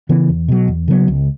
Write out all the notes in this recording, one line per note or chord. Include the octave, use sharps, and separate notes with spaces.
C#3 E3 B3
E2
B2 F#3
E2
C#3 F#3 B3
C#2